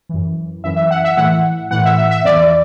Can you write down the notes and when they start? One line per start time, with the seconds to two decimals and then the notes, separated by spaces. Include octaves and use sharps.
0.09 F#2 E3
0.64 F#2 E3 E5
0.76 E5
0.91 F#5
1.04 E5
1.17 A2 E3 F#5
1.71 A2 E3 F#5
1.85 E5
1.98 E5
2.11 E5
2.24 E2 E3 D5